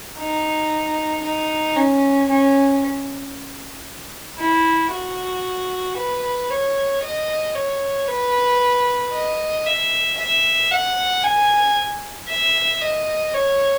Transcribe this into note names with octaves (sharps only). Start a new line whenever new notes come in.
D#4
D#4
C#4
C#4
E4
F#4
B4
C#5
D#5
C#5
B4
D#5
E5
E5
F#5
G#5
E5
D#5
C#5